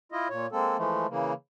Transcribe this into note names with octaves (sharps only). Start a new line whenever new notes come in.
E4 F4 D#5
A#2 C#5
G#3 A#3 C4 A4
E3 F3 G#3 A3
C#3 E3 A#3